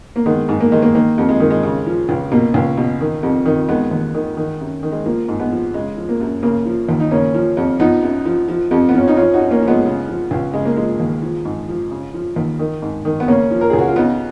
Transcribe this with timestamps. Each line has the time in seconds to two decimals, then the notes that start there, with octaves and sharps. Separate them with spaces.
0.16 A#3
0.26 D#3 G#3 B3
0.49 G#2
0.60 A#3
0.72 D#3 G#3
0.82 A#3
0.95 D#3 A#3
1.18 F2
1.29 G#3
1.40 D#3
1.51 G#3
1.63 C#3
1.86 F3
2.09 C#2
2.32 B2 A#3
2.54 C#2
2.77 B2
3.01 D#3
3.23 F2
3.45 D#3
3.68 D#3 G#3 B3
3.91 D#2
4.14 D#3
4.37 D#3
4.60 F#2
4.83 D#3
4.92 G#3
5.05 F3 A#3
5.29 G#2
5.40 G#3 B3
5.51 F3
5.74 C#3 G#3
5.97 F3
6.09 A#3
6.20 F#2
6.43 C#3 A#3
6.65 F3
6.89 D#2
7.00 D#4
7.11 C#3 A#3 C#4
7.34 F3
7.57 F2
7.80 F3 B3 D#4
8.02 F#2
8.25 F3
8.48 F3
8.71 F2
8.89 B3
8.94 F3 C#4
9.08 D#4
9.17 F3 C#4 F4
9.34 D#4 F#4
9.40 F#2
9.51 A#3 C#4
9.62 F3
9.68 G#3 B3
9.86 C#3
10.08 F3
10.31 C#2
10.54 C#3 G#3
10.65 A#3
10.77 F3 G#3
11.00 D#2
11.22 F3
11.45 G#2
11.68 F3
11.91 C#3
12.14 F3
12.36 D#2
12.59 D#3
12.82 G#2
13.05 D#3
13.20 B3
13.28 C#3 A#3 C#4
13.51 F3
13.61 A#4
13.70 C#2 G#4
13.79 F#4
13.88 F4
13.96 C#3 B3 D#4